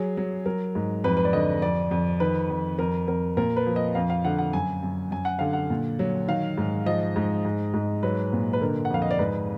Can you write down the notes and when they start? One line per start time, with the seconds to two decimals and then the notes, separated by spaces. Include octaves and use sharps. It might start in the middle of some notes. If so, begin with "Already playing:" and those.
Already playing: F#3 G#4
0.17 F#3
0.46 F#3 A#4
0.75 G#2
1.04 F2 B4
1.17 B4
1.25 D5
1.33 D3 D#5
1.62 F2 D5
1.91 F2
2.20 D#3 B4
2.50 F2
2.79 F2 A#4
3.08 F2 A#4
3.37 A#2 A#4
3.57 B4
3.66 F3
3.76 D#5
3.95 F2 F5
4.10 F5
4.25 D3 F#5
4.38 F#5
4.53 F#2 G#5
4.83 F#2
5.11 F#2 G#5
5.25 F#5
5.39 D3 F5
5.53 F#5
5.70 A#2
5.99 F#3
6.28 D#3 F5
6.58 G#2
6.86 F3 D#5
7.16 G#2
7.45 G#2
7.74 G#2
8.03 F#3 B4
8.33 A#2
8.53 B4
8.61 D3 A#4
8.85 F#5
8.90 F2 F5
9.02 D#5
9.11 D5
9.19 G#2 B4